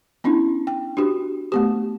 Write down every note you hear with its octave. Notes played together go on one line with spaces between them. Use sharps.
B3 C#4 D4 E4
G5
D4 F#4 G4
A3 B3 G4